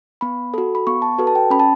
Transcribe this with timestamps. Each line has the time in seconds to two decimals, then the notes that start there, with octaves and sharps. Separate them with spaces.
0.21 B3 B5
0.54 F#4 A4
0.75 B5
0.87 B3 C#6
1.02 A5
1.18 F#4 A4 B4
1.27 A5
1.35 G5
1.50 C#4 B5
1.60 A5